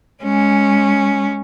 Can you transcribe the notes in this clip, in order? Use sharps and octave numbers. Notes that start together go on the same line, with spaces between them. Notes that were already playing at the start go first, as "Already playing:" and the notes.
G#3 C#4